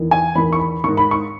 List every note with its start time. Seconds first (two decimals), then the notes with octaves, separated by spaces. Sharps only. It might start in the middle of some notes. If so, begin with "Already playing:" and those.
Already playing: E2 D#3
0.11 G#5
0.35 E2 D#3 B5
0.53 C#6
0.59 B5
0.84 G#2 D#3 C#6
0.97 B5
1.11 C#6